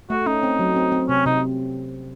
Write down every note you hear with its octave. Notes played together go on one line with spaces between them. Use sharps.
A3 F#4
C#4 D#4
C4
F#3
C4
C4
C3 C#4
C3 D#4